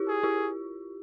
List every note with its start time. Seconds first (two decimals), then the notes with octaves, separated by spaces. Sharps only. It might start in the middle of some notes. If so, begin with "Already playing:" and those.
Already playing: E4 F4 G4
0.08 G#4
0.23 E4 G4